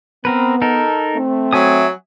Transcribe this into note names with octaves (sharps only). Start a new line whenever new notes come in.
B3 C4 A#4 B4
D#4 A4 A#4
A3 C4
F#3 E5 G#5 D#6